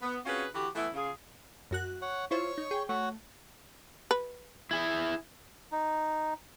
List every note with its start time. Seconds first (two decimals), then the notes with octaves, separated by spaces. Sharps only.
0.02 B3
0.26 C4 C#4 F4 F#4 G#4 B4
0.55 D3 E3 F#4 G4
0.75 E3 A3 B3 E4
0.94 C#3 F4 G#4
1.71 F#2 F#4 F#6
2.02 C#5 F#5
2.31 E4 F4 C5 C#5 C#6
2.58 D#4
2.71 G#4 G5
2.89 A3 F#4 C#5 F#5
4.11 B4
4.71 E4 G#4
5.72 D#4